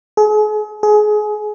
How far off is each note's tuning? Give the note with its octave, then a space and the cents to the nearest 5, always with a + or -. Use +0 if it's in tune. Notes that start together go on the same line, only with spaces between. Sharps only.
G#4 +40
G#4 +25